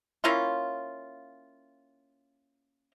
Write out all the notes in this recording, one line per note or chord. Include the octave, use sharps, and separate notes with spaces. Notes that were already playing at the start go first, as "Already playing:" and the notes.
A#3 C#4 E4 F4